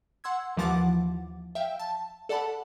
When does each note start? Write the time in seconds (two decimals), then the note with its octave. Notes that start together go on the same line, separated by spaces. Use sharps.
0.24 F#5 C6 E6 G#6
0.57 D#2 E3 F3 F#5 D6 A6
1.55 E5 F5 G5
1.80 A5
2.29 A4 D5 F#5 A5 B5